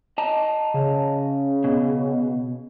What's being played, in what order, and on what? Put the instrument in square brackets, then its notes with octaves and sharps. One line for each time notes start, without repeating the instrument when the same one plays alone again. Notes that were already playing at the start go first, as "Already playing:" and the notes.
[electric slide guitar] D#5 A5 A#5
[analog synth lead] C#3
[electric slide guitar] B2